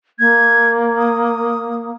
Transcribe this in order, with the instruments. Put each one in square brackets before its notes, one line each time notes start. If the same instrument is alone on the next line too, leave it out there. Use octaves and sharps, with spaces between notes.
[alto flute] A#3 [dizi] G#6
[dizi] D#6